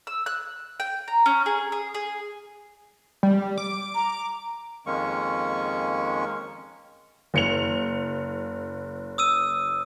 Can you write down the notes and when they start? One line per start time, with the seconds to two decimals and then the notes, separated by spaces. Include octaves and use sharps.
0.07 E6
0.26 F#6
0.80 G5
1.08 A#5
1.26 C#4
1.46 G#4
1.72 G#4
1.95 G#4
3.23 G3
3.58 D6
3.95 A#5
4.86 F2 D#3 G#3 A#3 C#4 C#6
7.34 F#1 C#7 F7
9.18 D#6 E6 D#7